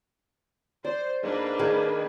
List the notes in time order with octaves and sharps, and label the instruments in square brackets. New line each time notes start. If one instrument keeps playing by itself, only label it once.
[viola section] C5 [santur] D5
[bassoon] G#2 [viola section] A#3 D4 B4
[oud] D#3 [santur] G#4